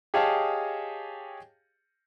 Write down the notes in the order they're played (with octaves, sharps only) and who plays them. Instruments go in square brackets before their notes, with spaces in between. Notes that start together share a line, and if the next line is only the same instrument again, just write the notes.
[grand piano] G4 G#4 C#5 D#5 F5 A5